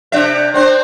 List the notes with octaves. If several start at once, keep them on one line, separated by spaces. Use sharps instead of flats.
C3 D4 E5
C4 D4 C5